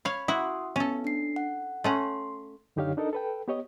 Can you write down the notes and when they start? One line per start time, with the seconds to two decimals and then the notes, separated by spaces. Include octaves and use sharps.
0.05 C#5 F5 B5
0.28 E4 F#4 F#5 C6 D#6
0.76 B3 C#4 A4
1.04 D4 C7
1.36 F#5
1.84 A3 C#4 F#5 C6
2.76 F#2 D3 D#4 G4 C#5 F5
2.97 D4 D#4 A4 A#4 D#5
3.13 A4 B4 G5
3.48 B3 G4 C#5 D#5